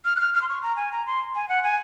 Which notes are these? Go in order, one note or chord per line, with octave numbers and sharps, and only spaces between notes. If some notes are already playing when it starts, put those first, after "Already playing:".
F6
F#6
F6
F6
C6
C#6
A#5
G#5
A#5
C6
G#5
F#5
G#5